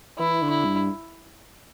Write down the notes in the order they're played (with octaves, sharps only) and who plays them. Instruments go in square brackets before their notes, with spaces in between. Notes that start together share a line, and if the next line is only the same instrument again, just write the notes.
[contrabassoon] E3 [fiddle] E4
[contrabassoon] D3
[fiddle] E4
[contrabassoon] G2